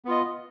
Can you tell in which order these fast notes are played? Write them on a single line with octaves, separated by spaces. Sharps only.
B3 F4 D#5